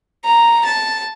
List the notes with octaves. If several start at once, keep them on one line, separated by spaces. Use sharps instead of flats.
A#5
A5